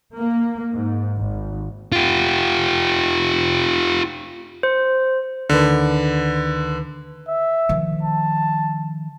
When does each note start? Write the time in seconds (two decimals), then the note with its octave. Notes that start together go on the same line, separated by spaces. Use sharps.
0.16 A#3
0.75 G#2
1.18 G#1
1.92 F4 G4
4.63 C5
5.49 D2 D3 D#3 B4
7.29 E5
7.69 D#3 F3
8.03 A5